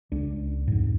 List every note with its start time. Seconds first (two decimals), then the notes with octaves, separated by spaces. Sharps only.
0.12 C#2 D4
0.68 F2 G#2